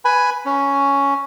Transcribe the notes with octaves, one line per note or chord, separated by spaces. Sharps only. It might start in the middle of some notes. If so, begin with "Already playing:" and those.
B4 G#5 B5
C#4